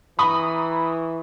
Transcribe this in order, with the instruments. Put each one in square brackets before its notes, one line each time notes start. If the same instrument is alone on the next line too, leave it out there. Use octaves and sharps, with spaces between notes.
[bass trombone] E3 [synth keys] A#5 C#6 D#6 [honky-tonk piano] B5